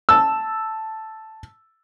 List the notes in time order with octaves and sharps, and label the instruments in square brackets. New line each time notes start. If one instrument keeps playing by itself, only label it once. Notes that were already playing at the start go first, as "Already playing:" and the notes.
[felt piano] A5 E6